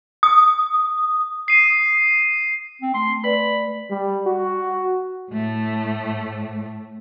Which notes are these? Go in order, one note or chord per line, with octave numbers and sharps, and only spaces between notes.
D#6
C7 D#7
C4
A3 C6
B4 D5 B5
G3
F#4
A2 A3